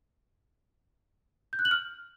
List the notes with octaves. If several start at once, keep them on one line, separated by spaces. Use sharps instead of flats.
G6
F#6
F#7
F6